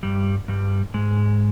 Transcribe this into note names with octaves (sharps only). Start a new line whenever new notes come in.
G2 G3
G2 G3
G#2 G#3